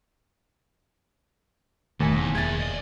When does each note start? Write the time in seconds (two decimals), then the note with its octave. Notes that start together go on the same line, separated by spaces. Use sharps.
2.00 E1 D#2 A2 D#3 A3 G#5
2.16 E2
2.35 G#4 E5 G#6 A6
2.60 D5 D#5